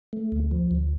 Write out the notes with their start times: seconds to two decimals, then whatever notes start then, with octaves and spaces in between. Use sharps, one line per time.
0.13 A3
0.32 D2
0.51 F3
0.71 D2